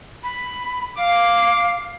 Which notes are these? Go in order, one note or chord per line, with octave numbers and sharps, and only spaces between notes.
B5
F5 D6